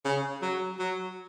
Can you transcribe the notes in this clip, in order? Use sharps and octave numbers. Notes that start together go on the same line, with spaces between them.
C#3
F#3
F#3